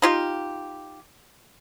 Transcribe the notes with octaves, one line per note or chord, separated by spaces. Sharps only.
D#4 F4 G4